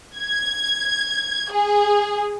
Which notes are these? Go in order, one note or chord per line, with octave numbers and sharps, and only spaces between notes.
G#6
G#4